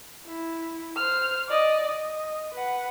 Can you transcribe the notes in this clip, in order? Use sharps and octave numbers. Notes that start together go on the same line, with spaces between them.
E4
C5 F6
D5 D#5
D#5
B4 F#5